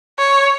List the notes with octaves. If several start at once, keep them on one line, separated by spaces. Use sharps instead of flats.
C#5